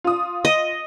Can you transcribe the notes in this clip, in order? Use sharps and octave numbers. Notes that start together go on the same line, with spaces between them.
F4 D#6
D#5